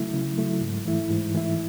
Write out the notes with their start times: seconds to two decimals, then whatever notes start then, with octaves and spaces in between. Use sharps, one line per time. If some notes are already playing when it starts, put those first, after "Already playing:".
Already playing: C#3 F#3 A3 E4
0.14 C#3
0.38 F#3 A3 E4
0.61 G#2
0.85 E3 A3 E4
1.11 G#2
1.35 E3 A3 E4